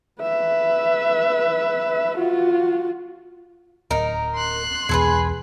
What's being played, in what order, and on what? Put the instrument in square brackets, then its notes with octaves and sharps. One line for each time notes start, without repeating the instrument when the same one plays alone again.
[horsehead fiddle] B4 E5
F4 F#4
[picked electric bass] D1 [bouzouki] D#4 A#4
[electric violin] C6 F#6
[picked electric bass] B1 E2 B2 [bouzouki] G#4 A4 B4